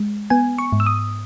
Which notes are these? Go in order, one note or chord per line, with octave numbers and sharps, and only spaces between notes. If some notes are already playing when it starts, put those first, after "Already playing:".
Already playing: G#3
B3 G#5
C#6
G#2
E6
D#6